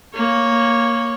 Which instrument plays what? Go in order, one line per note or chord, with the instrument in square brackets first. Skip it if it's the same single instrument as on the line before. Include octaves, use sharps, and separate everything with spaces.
[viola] A#3 C#5